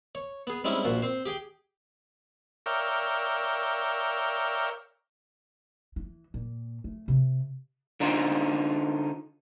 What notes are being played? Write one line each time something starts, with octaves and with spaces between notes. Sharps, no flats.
C#5
B3 G#4
G3 G#3 C4 C#4 D#4 E4
A#1 A#2 F3 F#4
C4 C5
G4 G#4 G5
A#4 C#5 D5 E5 F5 G5
E3
A#2
A3
C3
D3 D4 D#4 F4 C5